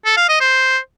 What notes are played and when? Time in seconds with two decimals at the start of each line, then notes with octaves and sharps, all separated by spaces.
0.05 A4
0.17 F5
0.29 D#5
0.40 C5